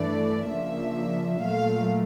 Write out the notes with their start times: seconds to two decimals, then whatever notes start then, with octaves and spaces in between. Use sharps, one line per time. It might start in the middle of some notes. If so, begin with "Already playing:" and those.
Already playing: G2 E3 A3 D4 D5
0.47 C#3 F3 A#3 D4 E5
1.41 A#2 F#3 A3 F5